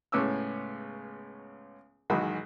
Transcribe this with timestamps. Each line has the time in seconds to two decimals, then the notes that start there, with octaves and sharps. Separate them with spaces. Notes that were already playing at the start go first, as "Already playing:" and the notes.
0.12 C#2 A2 B3 C#4 D6 E6
2.10 B1 G#2 D#3 E3 F#4 B5